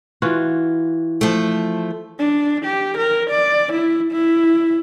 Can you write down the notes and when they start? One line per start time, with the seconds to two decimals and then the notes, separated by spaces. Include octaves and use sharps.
0.22 E3 F4 F#4
1.21 F3 A3
2.19 D4
2.65 G4
2.98 A#4
3.30 D5
3.72 E4
4.12 E4